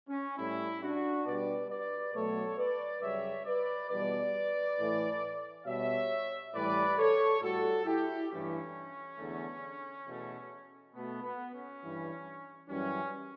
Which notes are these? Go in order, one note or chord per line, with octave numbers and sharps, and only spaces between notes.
C#4
A2 G3 C#4 E4
D4 F#4
B2 G3 B4 D5
B4 D5
B2 F#3 A3 A4 C#5
B4 D5
F#2 C#3 G3 C#5 E5
B4 D5
E2 B2 G3 B4 D5
A2 E3 A3
B2 G3 C#5 E5
A2 E3 G3 B4 D5
A4 C#5
A2 G3 F#4 A4
E4 G4
G2 E3 A3 C#4
E2 D3 A3
E2 B2 A3
B2 A3 B3
B3
C#4
G2 E3 G3
F#2 E3 G3 C#4